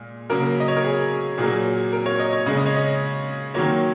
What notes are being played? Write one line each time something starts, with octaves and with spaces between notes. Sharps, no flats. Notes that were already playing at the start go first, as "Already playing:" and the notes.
Already playing: A#2 G#3
C#3 F#3 A#3 A#4
D#5
C#5
A#4
G#4
A#2 F#3 A#3 G#4
A#4
C#5
D#5
C#5
C#3 G#3
D#5
C#5
D#5
D#3 F#3 A#3 C#5